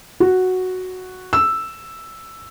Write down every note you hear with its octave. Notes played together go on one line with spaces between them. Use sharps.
F#4
E6